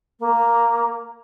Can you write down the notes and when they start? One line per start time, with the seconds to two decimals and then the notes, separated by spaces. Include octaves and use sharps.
0.19 A#3